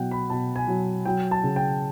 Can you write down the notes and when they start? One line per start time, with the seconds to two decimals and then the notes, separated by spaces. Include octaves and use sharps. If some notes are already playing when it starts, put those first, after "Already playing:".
Already playing: B2 F#3 F#5 G5
0.11 B5
0.30 B2 A5
0.56 G#5
0.67 F#3
1.05 F#3 G5
1.31 A5
1.43 C#3
1.56 G5